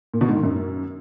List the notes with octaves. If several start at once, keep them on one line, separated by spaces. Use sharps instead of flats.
A#2
B2
G#2
D#3
F#2